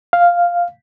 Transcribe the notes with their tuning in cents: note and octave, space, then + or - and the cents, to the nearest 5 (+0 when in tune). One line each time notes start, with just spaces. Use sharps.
F5 +0